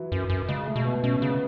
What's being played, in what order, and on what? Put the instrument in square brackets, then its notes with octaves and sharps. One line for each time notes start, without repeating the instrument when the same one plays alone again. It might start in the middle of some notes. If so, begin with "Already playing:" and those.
Already playing: [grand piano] E3 F#3
[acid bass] F#2
F#2
[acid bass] C#3 [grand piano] G#3
[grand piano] A3
[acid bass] B2
[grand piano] B3
[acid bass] B2 [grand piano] C#4
[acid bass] C#3
[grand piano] B3